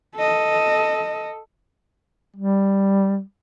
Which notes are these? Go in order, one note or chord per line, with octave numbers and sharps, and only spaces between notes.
A4 D#5
G3